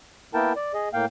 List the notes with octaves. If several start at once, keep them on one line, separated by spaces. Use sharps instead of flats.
A#3 B3 E4 A#4 G5 A5
D5
G#4 D#5
A2 A#3 F5 G5